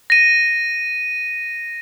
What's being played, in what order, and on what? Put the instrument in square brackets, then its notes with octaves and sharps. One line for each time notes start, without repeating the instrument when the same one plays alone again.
[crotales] A#6 D#7